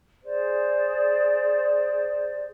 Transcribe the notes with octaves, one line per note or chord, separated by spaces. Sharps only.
G#4 C5 D5